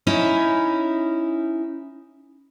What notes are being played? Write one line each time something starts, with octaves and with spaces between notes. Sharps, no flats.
C#4 D#4 E4